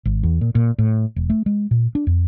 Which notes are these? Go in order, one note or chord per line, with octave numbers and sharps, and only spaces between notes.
G#1
E2
A#2
A#2
A2
E1
A3
G#3
A#2
D4
F2